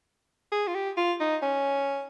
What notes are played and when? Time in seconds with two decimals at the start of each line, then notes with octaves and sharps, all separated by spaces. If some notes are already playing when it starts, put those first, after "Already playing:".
0.52 G#4
0.67 F4
0.75 G4
0.97 F4
1.20 D#4
1.42 C#4